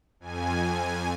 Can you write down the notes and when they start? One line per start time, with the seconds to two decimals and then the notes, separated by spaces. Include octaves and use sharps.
0.20 F2 G#5